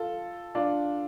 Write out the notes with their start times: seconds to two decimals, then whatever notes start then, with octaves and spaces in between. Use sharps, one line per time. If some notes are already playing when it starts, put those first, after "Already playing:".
Already playing: F4 A4
0.55 D4 F4